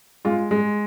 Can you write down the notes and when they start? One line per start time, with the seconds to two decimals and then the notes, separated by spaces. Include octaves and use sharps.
0.25 G#3 F4
0.51 G#3